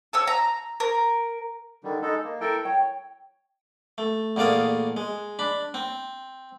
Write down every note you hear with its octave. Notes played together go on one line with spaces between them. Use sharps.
A4 C#5 E6
A#5
A#4
D3 D#3 G3
G#3 D#4 A4 B5
A#3
E4 A4 A#4 G5
C#5 G5
A3
E2 A#2 A3 D5 F5 D#6
G#3
D4 B5
C4